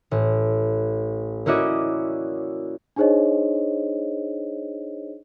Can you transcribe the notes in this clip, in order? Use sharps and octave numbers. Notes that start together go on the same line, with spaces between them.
A1
A#3 C#4 E4 F#4 D5 D#5
D4 D#4 G#4 C5 C#5 D#5